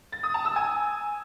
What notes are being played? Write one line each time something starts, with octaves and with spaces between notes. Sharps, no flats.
A6
D#6
A5
E6
G#5